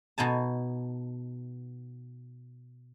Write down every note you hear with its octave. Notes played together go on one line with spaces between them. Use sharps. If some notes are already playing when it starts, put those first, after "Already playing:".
B2 D#4 G#5 A5